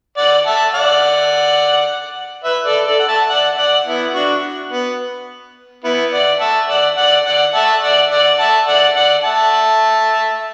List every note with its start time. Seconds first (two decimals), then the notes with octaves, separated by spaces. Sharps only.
0.17 D5 F#5
0.46 E5 A5
0.74 D5 F#5
2.44 B4 E5
2.65 A4 D5
2.87 A4 D5
3.00 F#5
3.08 E5 A5
3.29 D5 F#5
3.57 D5 F#5
3.86 B3 E4
4.14 D4 F#4
4.72 B3
5.84 B3 E4
6.13 D5 F#5
6.40 E5 A5
6.69 D5 F#5
6.97 D5 F#5
7.26 D5 F#5
7.54 E5 A5
7.83 D5 F#5
8.11 D5 F#5
8.39 E5 A5
8.67 D5 F#5
8.96 D5 F#5
9.24 E5 A5